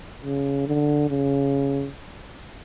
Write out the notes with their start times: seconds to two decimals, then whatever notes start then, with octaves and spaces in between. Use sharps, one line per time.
0.23 C#3
0.67 D3
1.10 C#3